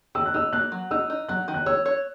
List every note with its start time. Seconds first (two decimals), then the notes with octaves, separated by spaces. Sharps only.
0.15 D#3 E6
0.26 F#6
0.34 D#4 E6
0.53 A#3 F#6
0.72 F#3
0.91 D#4 E6
1.10 D#4
1.28 F#3 F#6
1.48 D#3
1.54 F#6
1.66 C#5 E6
1.86 C#5